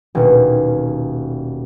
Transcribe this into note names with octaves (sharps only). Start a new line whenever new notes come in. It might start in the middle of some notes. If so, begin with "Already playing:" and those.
D#1 B2 C#4